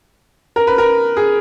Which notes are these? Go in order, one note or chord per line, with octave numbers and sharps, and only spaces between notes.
A#4
B4
A#4
G#4